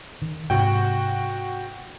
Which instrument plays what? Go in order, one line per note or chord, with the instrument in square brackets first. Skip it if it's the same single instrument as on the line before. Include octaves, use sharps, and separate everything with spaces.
[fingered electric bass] D#3
[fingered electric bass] G#2 C3 [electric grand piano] F#4 G5